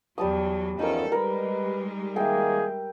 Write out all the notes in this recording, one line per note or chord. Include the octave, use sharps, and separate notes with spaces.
E2 F#3 G3 A5 D#6
E2 F3 C#4 D#4 A4 A#4
G3 G#3 A#4 B4 B5
D#3 A#3 G#4 E5 G5